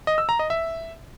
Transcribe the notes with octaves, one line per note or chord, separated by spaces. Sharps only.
D#5
E6
A#5
D#5
E5